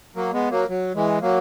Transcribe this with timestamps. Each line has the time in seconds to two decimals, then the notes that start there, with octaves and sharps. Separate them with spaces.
0.15 F#3 A#3
0.33 G#3 B3
0.51 F#3 A#3
0.69 F#3
0.95 E3 G#3
1.21 F#3 A#3